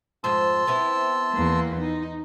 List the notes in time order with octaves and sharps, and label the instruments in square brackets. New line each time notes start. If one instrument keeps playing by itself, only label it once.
[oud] F2 G#2 C5 [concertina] A5 C6 E6
[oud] B3 C4 E4
[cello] E2 A#3
D#4